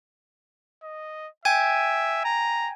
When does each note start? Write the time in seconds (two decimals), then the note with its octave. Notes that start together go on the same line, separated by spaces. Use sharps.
0.83 D#5
1.45 E5 G5 G#5 G#6
2.25 A#5